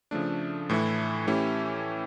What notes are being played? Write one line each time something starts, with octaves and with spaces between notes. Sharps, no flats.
C#3 F3 A3 D4
A2 E3 A3 E4
E3 A3 C#4 E4 G4